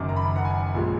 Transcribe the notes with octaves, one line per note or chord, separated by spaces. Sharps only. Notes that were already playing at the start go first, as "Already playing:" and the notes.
Already playing: F#1 F#2 D#3 D6
A#5
B5
F#5
G#5
A#1 F3 G#3